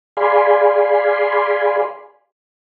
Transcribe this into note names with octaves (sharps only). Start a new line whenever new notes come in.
G#4 D5 F5 G#5 B5 C6